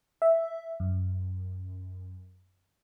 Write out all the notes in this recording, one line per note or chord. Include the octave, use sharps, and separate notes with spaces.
E5
F#2